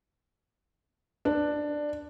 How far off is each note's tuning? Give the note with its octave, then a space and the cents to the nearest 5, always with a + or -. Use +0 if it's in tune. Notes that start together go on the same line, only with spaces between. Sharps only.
D4 +10